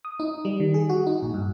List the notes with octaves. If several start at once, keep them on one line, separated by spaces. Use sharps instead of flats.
D#6
D#4
G3
D#3
G#4
F#4
D#4
A#1
G2